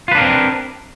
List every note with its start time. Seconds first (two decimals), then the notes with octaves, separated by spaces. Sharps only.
0.08 F4
0.11 B4
0.15 D4
0.18 A#4
0.22 C4